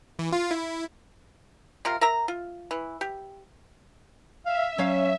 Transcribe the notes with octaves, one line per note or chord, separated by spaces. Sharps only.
E3
F4
E4
C3 F4 A#4
A#4 E5 A#5
F4
E3
G4
E5 F5
F#3 C#4 C#5 F5